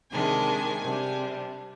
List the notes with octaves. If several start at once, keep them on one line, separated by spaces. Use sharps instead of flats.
C3 D#3 G#3 D4 G#5
C3 G3 D4